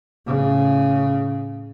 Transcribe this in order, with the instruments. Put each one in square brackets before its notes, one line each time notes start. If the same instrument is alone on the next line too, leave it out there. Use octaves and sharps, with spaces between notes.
[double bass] A2 C#3